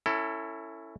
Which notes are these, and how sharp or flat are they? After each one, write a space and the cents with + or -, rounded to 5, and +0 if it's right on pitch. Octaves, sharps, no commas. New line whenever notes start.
C#4 +0 E4 +5 A4 +30